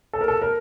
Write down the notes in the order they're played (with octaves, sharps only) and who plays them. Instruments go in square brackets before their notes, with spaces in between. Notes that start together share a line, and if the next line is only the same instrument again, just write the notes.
[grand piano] A4
A#4
A4
A#4